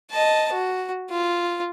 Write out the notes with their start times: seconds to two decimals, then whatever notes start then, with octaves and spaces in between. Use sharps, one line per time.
0.11 D#5 A5
0.53 F#4
1.10 F4